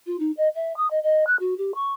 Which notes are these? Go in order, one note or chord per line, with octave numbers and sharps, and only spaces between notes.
F4
D#4
D#5
E5
D#6
D#5
D#5
F#6
F#4
G4
C#6